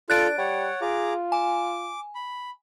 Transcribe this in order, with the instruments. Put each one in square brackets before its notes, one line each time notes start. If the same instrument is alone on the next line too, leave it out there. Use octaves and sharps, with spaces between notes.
[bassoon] D4 [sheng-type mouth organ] F4 A4 [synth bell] F#6 A6 D7
[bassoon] G3 [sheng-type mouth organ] C#5 F#5
[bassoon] F4 [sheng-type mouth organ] G#4 A#5 D6
[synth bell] G#5 [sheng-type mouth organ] D6
[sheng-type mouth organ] B5